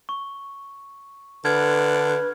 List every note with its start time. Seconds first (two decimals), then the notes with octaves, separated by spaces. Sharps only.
0.09 C#6
1.45 D3 B4 F6 G#6